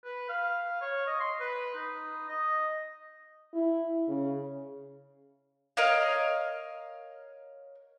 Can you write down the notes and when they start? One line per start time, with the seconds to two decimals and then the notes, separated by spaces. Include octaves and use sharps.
0.05 B4
0.29 F5
0.81 C#5
1.07 D#5
1.20 C6
1.41 B4
1.75 D#4
2.28 D#5
3.54 E4
4.08 C#3
5.77 A#4 C#5 D#5 F5